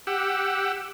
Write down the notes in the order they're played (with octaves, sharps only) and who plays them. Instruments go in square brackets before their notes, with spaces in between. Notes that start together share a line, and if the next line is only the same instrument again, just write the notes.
[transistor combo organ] G4 F#5 E6